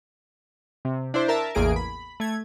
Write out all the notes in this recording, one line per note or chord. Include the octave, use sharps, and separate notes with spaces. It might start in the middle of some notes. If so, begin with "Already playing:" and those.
C3
D4 E4 C5
A#4 E5 A5
A1 E2 A#3 G#4 G#5 D7
B5
A3 G#6